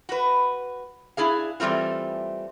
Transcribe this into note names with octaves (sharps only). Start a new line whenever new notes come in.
F#4 B4
D4 E4 G#4 F5
E3 G3 A3 C4 F4